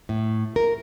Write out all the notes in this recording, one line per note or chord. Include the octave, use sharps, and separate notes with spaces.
A2
A#4